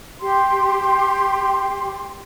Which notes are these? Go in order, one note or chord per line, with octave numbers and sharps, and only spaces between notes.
G4 C6